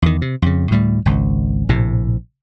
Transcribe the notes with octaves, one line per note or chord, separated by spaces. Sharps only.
E2 D#3
C3
F2 C#3
D2 A2 G3
G#1 C#2
A#1 A2 C3